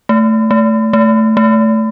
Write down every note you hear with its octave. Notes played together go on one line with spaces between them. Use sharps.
A3
A3
A3
A3